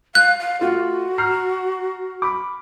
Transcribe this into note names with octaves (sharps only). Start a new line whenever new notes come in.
F5 F#6
F5
A3 F4 F#4
A#5 F6 C7
B5 D6